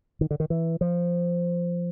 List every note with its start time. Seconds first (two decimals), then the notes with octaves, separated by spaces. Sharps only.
0.21 D#3
0.31 D3
0.40 D#3
0.50 E3
0.81 F3